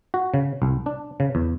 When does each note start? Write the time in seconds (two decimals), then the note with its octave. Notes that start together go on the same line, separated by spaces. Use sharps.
0.14 F#4
0.34 C#3
0.62 C2
0.86 D4
1.20 C#3
1.35 E2